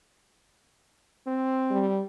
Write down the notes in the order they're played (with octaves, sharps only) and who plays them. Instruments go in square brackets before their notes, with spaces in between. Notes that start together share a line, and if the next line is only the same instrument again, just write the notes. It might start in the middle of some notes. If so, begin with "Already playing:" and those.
[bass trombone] C4
[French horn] G3